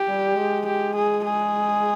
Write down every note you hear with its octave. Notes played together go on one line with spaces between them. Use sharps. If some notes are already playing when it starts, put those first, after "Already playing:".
Already playing: G4
G3
G#3
G4
G#4
G#4